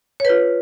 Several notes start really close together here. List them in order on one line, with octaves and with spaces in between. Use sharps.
C#5 B4 F4